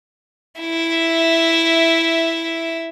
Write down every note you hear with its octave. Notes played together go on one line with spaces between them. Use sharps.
E4 E5